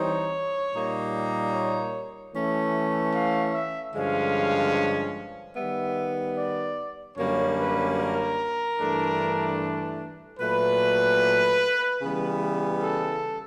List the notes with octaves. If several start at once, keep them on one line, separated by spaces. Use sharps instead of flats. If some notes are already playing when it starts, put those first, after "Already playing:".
Already playing: E3 G3 C4 D#4 C#5
A#2 G3 A#3 D#4
C#5
E3 A3 C#4
F5
E5
G2 D3 F3 G#3 C#4 F5
D#3 G3 B3 E5
D5
F#2 D3 G3 A#3 C#4 C#5
B4
A#4
G2 E3 A3 D4
A#2 F#3 A3 B4
C#3 E3 G3 B3
A4